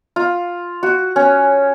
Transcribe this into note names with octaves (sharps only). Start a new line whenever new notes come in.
F4
F#4
C#4